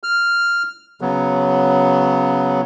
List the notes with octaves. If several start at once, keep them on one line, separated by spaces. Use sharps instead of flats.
F6
C#3 F#3 B3